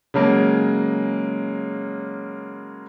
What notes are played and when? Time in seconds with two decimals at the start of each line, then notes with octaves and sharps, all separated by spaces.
0.14 C#3 F#3 G#3 A#3